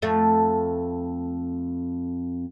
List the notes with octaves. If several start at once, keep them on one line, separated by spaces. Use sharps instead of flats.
F2 A3